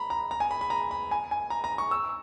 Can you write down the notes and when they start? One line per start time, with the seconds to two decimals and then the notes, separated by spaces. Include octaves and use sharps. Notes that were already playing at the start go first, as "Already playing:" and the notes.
Already playing: A#5 B5
0.10 A#5
0.31 A#5
0.40 G#5
0.51 B5
0.61 B5
0.70 A#5
0.91 B5
1.11 G#5
1.31 G#5
1.50 A#5
1.64 A#5
1.78 C#6
1.91 E6